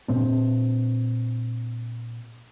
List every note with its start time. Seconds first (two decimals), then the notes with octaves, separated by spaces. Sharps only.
0.08 A#2 C4 D4